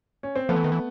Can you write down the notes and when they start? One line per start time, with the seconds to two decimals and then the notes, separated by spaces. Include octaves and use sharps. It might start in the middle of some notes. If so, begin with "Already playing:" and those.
0.23 C#4
0.36 C4
0.49 F3 A3 B3
0.56 E3
0.64 D#3
0.72 E3